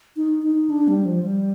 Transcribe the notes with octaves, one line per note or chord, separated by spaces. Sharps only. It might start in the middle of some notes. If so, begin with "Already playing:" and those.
D#4
D#4
D4
G3
F3
G3